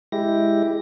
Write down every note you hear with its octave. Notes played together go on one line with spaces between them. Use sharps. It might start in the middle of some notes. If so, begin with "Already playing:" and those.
G#3 E4 G4 A#6